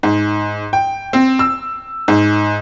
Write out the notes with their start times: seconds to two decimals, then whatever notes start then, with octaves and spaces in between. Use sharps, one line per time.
0.03 G#2
0.73 G5
1.13 C4
1.39 E6
2.08 G#2